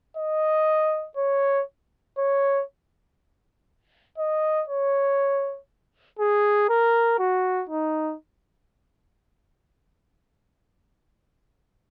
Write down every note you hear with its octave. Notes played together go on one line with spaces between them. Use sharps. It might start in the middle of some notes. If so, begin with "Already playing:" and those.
D#5
C#5
C#5
D#5
C#5
G#4
A#4
F#4
D#4